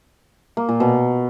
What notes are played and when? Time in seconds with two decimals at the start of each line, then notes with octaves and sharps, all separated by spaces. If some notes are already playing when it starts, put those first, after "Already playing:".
0.57 A#3
0.69 A#2
0.80 B2